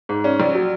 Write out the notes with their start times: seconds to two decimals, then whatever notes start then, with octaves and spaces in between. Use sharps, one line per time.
0.09 G#2
0.24 C#4
0.40 A#1
0.55 F#3